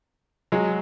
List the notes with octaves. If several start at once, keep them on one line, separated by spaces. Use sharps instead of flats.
F#3 G#3